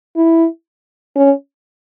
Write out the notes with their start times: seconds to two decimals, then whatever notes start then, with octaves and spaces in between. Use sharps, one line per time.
0.16 E4
1.16 C#4